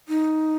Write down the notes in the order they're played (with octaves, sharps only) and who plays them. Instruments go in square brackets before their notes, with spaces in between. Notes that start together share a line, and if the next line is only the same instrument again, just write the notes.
[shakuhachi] D#4